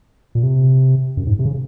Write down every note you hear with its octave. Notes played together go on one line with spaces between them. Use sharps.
A#2
C3
F#2
G#2
C3
C#3